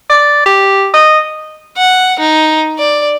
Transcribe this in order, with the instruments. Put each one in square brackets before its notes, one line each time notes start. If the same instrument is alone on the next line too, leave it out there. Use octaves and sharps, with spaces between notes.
[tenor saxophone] D5
G4
D#5
[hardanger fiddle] F#5
D#4
D5